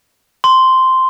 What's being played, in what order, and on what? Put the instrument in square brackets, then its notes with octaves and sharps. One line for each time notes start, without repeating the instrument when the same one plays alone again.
[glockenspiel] C6